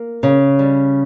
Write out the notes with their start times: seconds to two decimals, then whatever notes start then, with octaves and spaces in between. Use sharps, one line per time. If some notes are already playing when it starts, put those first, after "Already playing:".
Already playing: A#3
0.23 C#3
0.59 G3